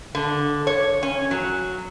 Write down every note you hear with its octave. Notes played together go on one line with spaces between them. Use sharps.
D3
C#5
C#4
F#3